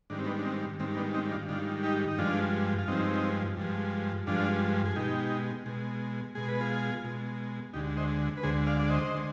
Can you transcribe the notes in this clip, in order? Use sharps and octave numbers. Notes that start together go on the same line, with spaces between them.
G#2 D#3 G3 D4
C4
B3 D4
D4
C4
G#2 D#3 G3 C4
B3 D4
C4 D#4
D4 F4
G#2 D#3 G3 D4 F4
D#4 G4
D#4
G2 F3 G#3 D4 F4
F4
G2 F3 G#3 C4 D#4
G2 F3 G#3
G2 F3 G#3 D4 F4
G#4
B2 G#3 D#4 G4
B2 G#3
B2 G#3 G#4
B4
F4 G#4
B2 G#3
D2 D3 G#3 D#4 G4
C5 D#5
B4
D2 D3 G#3 G#4 C5
D5 F5
D5
C5 D#5
D3 G#3